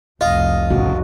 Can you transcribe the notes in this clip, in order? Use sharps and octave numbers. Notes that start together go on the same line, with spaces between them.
F1 C2 F4 D#5
G#1 A2 C#3 F#4